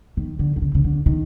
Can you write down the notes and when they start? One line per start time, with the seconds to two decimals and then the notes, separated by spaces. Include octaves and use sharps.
0.17 D#3
0.39 D3
0.56 D3
0.62 C#3
0.75 C#3
0.84 D3
1.06 D#3